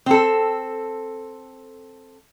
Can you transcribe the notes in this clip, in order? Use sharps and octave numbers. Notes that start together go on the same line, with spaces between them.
C4 A4